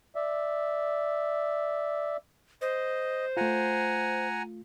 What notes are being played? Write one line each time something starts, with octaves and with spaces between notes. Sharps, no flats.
D5 E5
C5 D#5
A3 F4 F#5 G#5 A#5